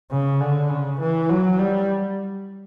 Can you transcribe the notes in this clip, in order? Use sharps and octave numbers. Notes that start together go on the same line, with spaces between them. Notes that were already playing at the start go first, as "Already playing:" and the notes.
C#3
D3
C#3
E3
F#3
G3